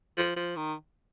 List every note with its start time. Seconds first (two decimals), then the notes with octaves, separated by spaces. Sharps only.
0.17 F3
0.36 F3
0.56 D#3